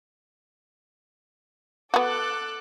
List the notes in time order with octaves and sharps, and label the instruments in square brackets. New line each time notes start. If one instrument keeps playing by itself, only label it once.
[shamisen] B3 F#4 [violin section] A4 D6 F#6